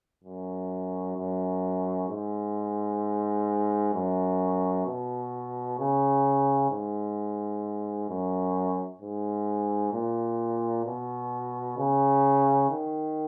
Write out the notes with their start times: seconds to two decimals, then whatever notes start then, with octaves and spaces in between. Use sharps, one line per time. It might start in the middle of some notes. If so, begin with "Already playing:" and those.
0.24 F#2
1.17 F#2
2.09 G#2
3.94 F#2
4.86 B2
5.79 C#3
6.70 G#2
8.09 F#2
9.01 G#2
9.93 A#2
10.85 B2
11.78 C#3
12.70 D#3